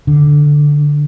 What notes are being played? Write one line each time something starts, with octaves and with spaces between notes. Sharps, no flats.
D3